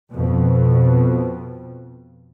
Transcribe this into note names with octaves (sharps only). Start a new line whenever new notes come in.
F2 B2